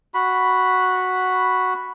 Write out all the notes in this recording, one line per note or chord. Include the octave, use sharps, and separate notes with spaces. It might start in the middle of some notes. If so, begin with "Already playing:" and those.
F#4 B5